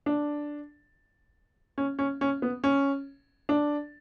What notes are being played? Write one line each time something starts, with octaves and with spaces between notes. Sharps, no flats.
D4
C#4
C#4
C#4
B3
C#4
D4